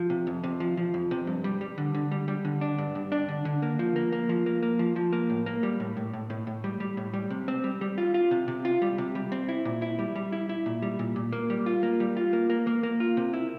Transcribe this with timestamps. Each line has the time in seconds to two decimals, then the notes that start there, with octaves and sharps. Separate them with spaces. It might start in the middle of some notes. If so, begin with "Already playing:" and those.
Already playing: F3
0.10 C3
0.27 F2
0.44 C3
0.60 F3
0.77 F3
0.94 F2
1.11 C3
1.27 G2
1.44 G3
1.61 G3
1.78 D3
1.95 D3
2.11 G3
2.28 G3
2.45 D3
2.61 D4
2.78 G2
2.95 G2
3.12 D4
3.29 D3
3.45 D3
3.62 A#3
3.79 F3
3.96 A#3
4.12 A#3
4.29 F3
4.46 A#3
4.63 A#3
4.79 F3
4.96 F3
5.13 A#3
5.30 A2
5.46 A#3
5.63 G3
5.80 A2
5.97 A2
6.13 A2
6.30 A2
6.47 A2
6.64 G3
6.80 G3
6.97 A2
7.14 G3
7.30 C3
7.48 C4
7.64 G3
7.81 G3
7.98 F4
8.14 F4
8.31 C3
8.48 C3
8.65 F4
8.82 G3
8.98 C3
9.15 G3
9.32 C4
9.49 E4
9.65 A#2
9.82 E4
9.99 G3
10.15 G3
10.32 E4
10.49 E4
10.66 A#2
10.82 G3
10.99 A#2
11.16 A#2
11.32 A#3
11.50 G3
11.66 F4
11.83 A#3
12.00 G3
12.17 F4
12.33 A#3
12.50 A#3
12.67 A#3
12.83 A#3
13.00 F4
13.17 C3
13.34 E4